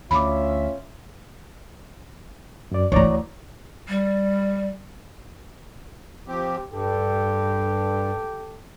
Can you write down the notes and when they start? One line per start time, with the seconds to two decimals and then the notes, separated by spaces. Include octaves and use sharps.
0.11 D2 C#4 F4 E5 B5 D6
2.71 F#2 D5
2.92 D2 E3 C#5 D5 A#5
3.89 G3
6.28 F3 C4 G4
6.72 G2 G4 A4